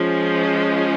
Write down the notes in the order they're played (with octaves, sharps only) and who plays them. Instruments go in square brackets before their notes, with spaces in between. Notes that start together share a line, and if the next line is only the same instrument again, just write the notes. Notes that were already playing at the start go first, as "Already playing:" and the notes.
Already playing: [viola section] F3 G#3 C#4